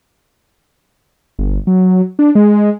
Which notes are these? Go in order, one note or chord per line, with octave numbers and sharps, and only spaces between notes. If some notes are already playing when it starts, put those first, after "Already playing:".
G1
F#3
D4
G#3